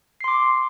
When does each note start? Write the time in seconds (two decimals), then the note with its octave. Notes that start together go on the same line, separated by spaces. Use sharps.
0.21 C7
0.24 C6
0.28 D6